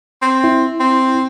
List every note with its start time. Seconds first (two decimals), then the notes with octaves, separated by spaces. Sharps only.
0.22 C4
0.44 E4
0.80 C4